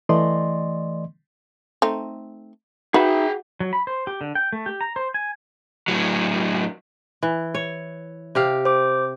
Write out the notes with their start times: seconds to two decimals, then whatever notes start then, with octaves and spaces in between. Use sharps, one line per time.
0.09 E3 A3 D5 D#5 C6
1.82 A3 C4 D#4
2.94 D#4 F#4 G#4 B4 E5 G5 B5
3.60 F#3
3.73 B5
3.87 C5
4.07 G4
4.21 D3
4.35 G5
4.53 A3
4.66 G4
4.81 A#5
4.96 C5
5.14 G#5
5.88 A2 F#3
7.23 E3
7.54 C#5
8.35 C3 G4 F5
8.65 C5 D6